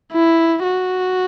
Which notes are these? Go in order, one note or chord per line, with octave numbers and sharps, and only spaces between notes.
E4
F#4